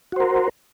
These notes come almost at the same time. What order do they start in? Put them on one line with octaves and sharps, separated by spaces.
F#4 C5 A#4